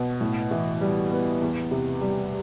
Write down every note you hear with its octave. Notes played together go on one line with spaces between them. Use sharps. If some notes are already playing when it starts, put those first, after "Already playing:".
Already playing: B2
A2
E3
G3
B3
E2
C3
G3